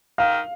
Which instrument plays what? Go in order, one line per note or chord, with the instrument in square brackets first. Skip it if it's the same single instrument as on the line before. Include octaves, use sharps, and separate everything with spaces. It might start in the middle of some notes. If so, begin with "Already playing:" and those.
[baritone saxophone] D#3 [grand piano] F5